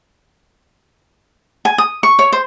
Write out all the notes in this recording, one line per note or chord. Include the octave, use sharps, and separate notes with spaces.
G#5
D#6
C#6
C#5
C5